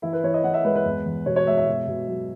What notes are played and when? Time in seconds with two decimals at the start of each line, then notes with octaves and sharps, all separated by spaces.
0.02 E3 E4
0.13 B4
0.24 E3 C#5
0.34 D#5
0.44 E3 F#5
0.54 E5
0.64 G#3 B4
0.75 B4
0.84 E2
1.06 E2
1.26 B2 C#5
1.36 C#5
1.47 G#3 E5
1.57 E5
1.67 B2
1.88 B2
2.08 F#3